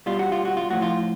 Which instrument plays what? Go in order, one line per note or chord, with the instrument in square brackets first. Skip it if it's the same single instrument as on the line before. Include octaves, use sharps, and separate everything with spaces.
[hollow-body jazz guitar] B2 G3 F4
F#4
F4
F#4
F4
A2 F3 F#4
F4